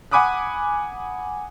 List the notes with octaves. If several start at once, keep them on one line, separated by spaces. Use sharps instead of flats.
F#5 G#5 B5 D6 D#6 F#6